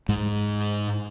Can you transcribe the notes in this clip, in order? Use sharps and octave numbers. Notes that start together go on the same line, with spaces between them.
G#2 G#3